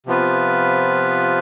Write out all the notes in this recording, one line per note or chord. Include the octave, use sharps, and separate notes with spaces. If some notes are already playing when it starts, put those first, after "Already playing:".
C3 F3 B3 F4 B4